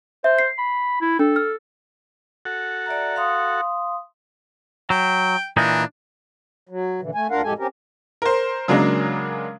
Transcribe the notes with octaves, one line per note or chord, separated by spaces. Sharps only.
C5 E5
C7
B5
E4
D4 A4
F6
F#4 A4 F#5
D5 E5 A#5
F5 C6 D#6
F#3 G5
A#2 E3 D4 D#4
F#3
A#2 D3 E3
A3 G#5
D2 D4 F4 A#4 F5 F#5
F2 A2 G#3 G4 A4 G#5
C4 C#4 G4 A#4
A#4 C5
C#3 F#3 G#3 A#3 D4 A#4